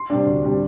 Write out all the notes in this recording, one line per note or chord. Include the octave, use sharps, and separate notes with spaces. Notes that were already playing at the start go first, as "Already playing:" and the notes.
Already playing: C6
C3 G3 D4
D2
C3 G3 D4